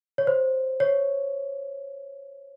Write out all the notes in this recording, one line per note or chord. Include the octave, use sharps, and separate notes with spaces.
C#5
C5
C#5